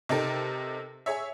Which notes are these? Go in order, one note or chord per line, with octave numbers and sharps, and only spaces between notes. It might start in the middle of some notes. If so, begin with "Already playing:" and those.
C3 D#4 G4 A4 A#4
G#4 C#5 E5